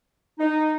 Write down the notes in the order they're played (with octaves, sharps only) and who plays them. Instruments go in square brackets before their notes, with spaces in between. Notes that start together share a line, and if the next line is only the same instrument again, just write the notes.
[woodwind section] D#4